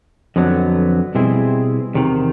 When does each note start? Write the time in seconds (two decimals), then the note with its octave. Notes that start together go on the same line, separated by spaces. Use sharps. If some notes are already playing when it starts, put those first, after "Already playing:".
0.36 F2 D3 F#3 B3
1.15 B2 G3 C4 E4 G#4
1.94 E2 C3 D#3